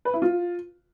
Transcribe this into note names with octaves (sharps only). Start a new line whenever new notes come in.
B4
E4
F4